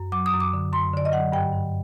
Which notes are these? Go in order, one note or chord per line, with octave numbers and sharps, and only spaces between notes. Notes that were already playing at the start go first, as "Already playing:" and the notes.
Already playing: F#2
F#3 D6
D#6
F#2
D6
D3
F#2 C6
D3 D5
D#5
F#3 F#5
G2 G5
G2